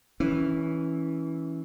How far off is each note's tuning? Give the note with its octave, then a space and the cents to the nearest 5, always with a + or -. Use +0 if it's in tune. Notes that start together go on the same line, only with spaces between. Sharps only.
E3 -15 C#4 +0